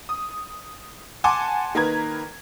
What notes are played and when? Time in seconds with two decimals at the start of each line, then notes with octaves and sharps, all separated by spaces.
0.09 D#6
1.24 F#5 G#5 A5 C6 D6
1.75 D#3 A#3 B4 A#5 G#6